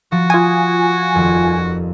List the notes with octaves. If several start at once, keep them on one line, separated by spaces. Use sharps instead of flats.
F3 F#4
F4 G#5 D#6 D#7
D#1 F2